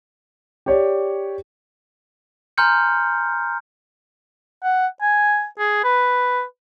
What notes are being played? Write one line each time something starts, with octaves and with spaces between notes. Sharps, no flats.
G4 C#5 D5
G#5 A#5 C6 F6 G6 C#7
F#5
G#5
G#4
B4